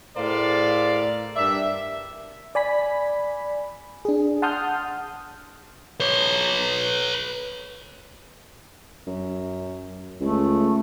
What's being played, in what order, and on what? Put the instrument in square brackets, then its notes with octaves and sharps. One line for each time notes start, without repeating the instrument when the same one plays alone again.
[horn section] A2 G#4 A#4 C5 D5 F5
G2 A#4 D5 E5
[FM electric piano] D5 G#5 B5 B6
D4 G#4
F#5 A5 C6 D#6 F6 G6
[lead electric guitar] B4 C#5
[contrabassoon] F#2
[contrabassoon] C#2 [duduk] A3